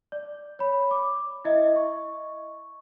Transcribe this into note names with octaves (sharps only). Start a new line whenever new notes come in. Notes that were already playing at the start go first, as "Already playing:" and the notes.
D5
C#5 B5
D6
E4 D#5 E5
C#6